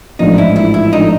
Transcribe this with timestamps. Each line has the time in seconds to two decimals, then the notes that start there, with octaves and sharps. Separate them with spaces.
0.19 A1 G#2 F3 A3 D4 D#4
0.38 E4
0.56 E4
0.74 E4
0.93 F3 A3 D4 D#4